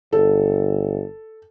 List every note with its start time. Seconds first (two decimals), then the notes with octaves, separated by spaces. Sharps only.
0.12 G1 A4